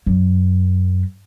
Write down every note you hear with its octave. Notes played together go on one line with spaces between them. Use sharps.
F#2